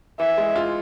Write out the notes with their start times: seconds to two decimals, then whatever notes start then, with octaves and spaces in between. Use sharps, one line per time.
0.19 E3 E5
0.38 G#3
0.56 F4